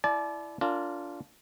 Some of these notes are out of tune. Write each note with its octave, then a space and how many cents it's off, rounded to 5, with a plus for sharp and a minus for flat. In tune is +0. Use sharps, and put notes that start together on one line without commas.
E4 +10 D5 +0 A5 -40
D4 -25 F4 +0 A#4 -35